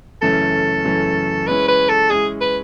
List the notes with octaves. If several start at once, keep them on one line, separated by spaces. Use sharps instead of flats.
F#2 C#3 E3 A3 C#4 A4
F#2 C#3 E3 A3 C#4
G#3 C#4 E4 B4
B4
A4
G#3 C#4 E4 G#4
B4